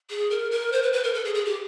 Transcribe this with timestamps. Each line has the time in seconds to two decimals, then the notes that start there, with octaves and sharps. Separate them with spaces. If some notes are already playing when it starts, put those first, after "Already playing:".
0.10 G#4
0.30 A#4
0.51 A#4
0.72 C5
0.82 B4
0.92 B4
1.03 A#4
1.14 A4
1.24 G#4
1.34 G#4
1.45 G4